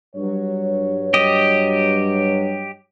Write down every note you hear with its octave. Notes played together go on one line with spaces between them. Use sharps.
G2 F#3 C#5
G4 D#5